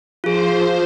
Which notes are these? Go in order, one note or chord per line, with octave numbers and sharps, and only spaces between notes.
F3 F4 G#4 C5